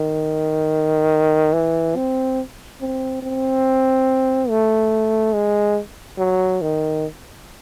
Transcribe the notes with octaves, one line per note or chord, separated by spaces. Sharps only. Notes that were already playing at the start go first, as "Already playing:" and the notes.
Already playing: D#3
E3
C4
C4
C4
A3
G#3
F#3
D#3